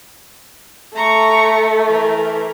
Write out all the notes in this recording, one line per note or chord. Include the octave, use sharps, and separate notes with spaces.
A3 A#5 C#6
E3 A#4